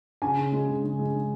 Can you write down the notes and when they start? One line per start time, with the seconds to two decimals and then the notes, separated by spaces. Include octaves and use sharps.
0.22 C#3 G#5
0.37 C#3
0.52 G#3
0.68 C#3
0.83 C#3
0.99 G#3
1.14 C#3